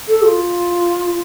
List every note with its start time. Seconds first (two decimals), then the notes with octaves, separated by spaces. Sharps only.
0.08 A4
0.24 F4